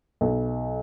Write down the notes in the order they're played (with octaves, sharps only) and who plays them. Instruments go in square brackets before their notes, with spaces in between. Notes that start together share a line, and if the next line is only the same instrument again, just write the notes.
[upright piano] B1